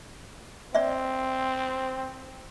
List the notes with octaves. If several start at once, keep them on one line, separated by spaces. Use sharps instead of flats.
C4 D5 E5